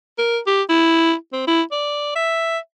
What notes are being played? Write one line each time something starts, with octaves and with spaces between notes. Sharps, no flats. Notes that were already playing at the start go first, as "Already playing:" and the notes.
A#4
G4
E4
C4
E4
D5
E5